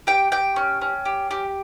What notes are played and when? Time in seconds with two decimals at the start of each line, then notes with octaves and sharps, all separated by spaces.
0.07 G4 G5
0.32 G4 G5
0.56 C#4
0.81 C#4
1.05 G4
1.31 G4